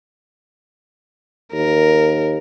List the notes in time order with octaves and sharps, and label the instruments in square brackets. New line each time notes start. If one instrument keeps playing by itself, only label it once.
[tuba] D#2 [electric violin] A#4